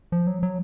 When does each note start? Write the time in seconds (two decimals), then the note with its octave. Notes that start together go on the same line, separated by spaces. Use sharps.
0.12 F3
0.27 F#3
0.43 F#3